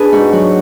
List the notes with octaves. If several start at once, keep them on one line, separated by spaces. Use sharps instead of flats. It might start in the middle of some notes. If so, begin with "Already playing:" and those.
Already playing: D4 G#4 B4
G#2 F#4
F#3 F#4